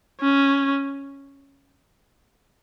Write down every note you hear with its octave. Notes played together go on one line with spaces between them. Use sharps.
C#4